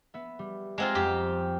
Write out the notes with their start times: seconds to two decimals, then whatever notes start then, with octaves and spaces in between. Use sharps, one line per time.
0.14 B3 E5
0.39 G3
0.78 G#3 C4 F4 G4 F#5 A#5
0.95 F2 G4